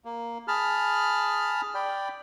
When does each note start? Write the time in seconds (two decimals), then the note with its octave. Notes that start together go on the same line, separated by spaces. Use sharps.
0.05 A#3
0.48 G#4 A5 B5 F6
1.74 D5 G5 B5